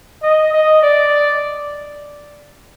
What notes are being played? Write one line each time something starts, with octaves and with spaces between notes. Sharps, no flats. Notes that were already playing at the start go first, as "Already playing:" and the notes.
D#5
D#5
D5